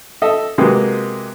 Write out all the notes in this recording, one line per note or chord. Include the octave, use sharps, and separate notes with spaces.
A4 D#5 E5
C3 F#3 G#3 A#3 B3